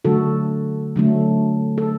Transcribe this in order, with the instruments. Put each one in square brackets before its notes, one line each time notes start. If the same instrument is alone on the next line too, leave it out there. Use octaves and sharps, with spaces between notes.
[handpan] D3 F#3 A3 F#4 A4
D3 F#3 A3
A4